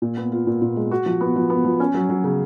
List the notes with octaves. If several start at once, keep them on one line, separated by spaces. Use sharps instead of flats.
A#2
B3
F4
A#2
A#2
G#3
F#4
F3
B3
F3
B3
F3
C#4
F#3
F#3
C#3